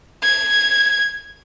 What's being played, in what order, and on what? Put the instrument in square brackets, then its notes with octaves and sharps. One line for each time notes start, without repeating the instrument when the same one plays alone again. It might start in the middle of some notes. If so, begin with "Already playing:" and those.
[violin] G#6